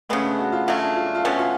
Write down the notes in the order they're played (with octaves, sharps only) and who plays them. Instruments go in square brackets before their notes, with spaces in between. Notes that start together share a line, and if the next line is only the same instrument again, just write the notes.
[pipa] C#3 G#3 B3 [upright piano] A3
[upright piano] D4
F#4
F4
[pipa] C#3 F#3 A3 [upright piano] F4
[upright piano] D4
F4
D4
F4
[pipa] B2 A3 C#4 [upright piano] F#4
[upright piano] F4